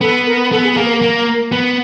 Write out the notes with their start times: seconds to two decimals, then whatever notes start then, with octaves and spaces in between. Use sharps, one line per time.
0.01 B3 A4
0.26 A#4
0.52 B3 A4
0.64 G#4
0.76 A#3 G#4
0.85 B4
0.89 A#4
1.02 A#3 A#4
1.52 B3